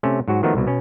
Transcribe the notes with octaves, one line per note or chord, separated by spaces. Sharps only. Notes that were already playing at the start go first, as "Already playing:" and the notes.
C3 A3 C#4
G#2 F#3 F#4
D#3 F3 F#3 A3 B3 D#4
C2 B2
B2 C#4